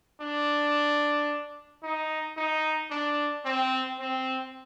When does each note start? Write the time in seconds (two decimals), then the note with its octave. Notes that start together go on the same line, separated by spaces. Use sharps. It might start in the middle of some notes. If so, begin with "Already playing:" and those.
0.21 D4
1.83 D#4
2.37 D#4
2.91 D4
3.45 C4
4.00 C4